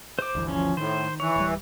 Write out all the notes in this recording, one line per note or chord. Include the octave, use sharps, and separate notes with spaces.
C5 D6
G1 D2 E3
F3 C#4
A2 D#3 C5
E3 C#5
D1 G3